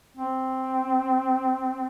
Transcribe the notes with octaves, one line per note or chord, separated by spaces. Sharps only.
C4